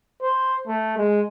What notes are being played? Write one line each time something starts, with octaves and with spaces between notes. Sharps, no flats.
C5
A3
G#3